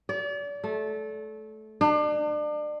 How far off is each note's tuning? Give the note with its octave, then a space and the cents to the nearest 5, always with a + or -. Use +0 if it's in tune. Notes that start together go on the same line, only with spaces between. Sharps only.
D5 -35
A3 -20
D4 +35